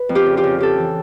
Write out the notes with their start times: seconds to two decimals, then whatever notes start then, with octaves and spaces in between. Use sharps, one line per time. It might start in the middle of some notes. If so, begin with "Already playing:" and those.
Already playing: B4
0.09 F2
0.15 F4 G4
0.26 C#3
0.37 F4 G4
0.44 C#3
0.58 C#3 G4 A4
0.77 E3